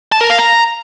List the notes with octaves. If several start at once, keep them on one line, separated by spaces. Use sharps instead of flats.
A5
A#4
F5
A#5